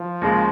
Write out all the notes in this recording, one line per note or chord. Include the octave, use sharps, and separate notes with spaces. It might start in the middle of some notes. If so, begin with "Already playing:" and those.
Already playing: F3
D#2 C#3 G#3